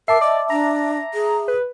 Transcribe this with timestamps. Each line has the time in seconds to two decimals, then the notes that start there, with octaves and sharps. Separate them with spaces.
0.08 A#4 E5 A5 D6 C7
0.21 D5 D#5
0.50 D4 A#5
1.14 G#4
1.48 B4